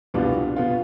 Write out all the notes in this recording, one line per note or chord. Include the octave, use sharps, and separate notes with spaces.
C2 B2 B3 D4 F4
B2 B3 F4